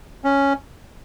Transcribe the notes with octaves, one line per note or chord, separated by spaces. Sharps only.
C#4